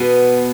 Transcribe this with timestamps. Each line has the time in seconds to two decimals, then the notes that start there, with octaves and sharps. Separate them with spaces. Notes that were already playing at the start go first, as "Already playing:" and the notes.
Already playing: B2 B3